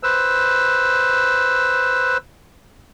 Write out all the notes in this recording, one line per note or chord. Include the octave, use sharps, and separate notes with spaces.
B4 C5 E6